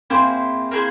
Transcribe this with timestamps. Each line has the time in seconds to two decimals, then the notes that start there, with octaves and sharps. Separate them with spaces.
0.10 A#3 C4 E4 G#4 C5
0.71 A#3 E4 G#4 C5